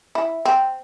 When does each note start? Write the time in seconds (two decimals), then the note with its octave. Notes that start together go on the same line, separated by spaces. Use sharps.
0.15 E4
0.45 C4